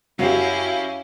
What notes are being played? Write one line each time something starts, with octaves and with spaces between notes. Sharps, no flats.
F#2 F#3 C#4 E4 G4 F5